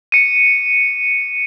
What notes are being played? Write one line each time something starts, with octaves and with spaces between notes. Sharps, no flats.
C#7 D#7